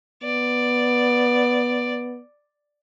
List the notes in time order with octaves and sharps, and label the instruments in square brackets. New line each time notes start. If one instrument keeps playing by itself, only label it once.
[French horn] B3 [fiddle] D5